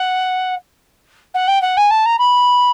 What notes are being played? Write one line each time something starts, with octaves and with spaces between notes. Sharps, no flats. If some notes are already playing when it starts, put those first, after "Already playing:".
Already playing: F#5
F#5
G5
F#5
G#5
A5
A#5
B5